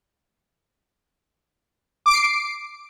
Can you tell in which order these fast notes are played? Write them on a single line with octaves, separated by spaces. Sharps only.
D6 D7 C7